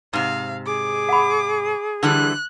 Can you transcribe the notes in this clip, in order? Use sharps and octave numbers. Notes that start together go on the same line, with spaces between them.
G#2 C3 F5
G#4 D6
F#5 B5
D3 E3 G3 F#6